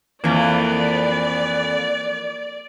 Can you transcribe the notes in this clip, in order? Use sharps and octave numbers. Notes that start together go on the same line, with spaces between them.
F2 E3 A#3 D5